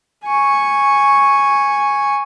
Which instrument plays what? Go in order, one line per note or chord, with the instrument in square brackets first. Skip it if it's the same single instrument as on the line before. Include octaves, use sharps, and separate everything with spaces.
[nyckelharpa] G#5 C#6